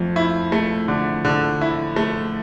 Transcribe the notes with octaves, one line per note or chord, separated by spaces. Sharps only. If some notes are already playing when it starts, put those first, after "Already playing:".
Already playing: F2 A3
E4
A3
D3
D3
E4
A3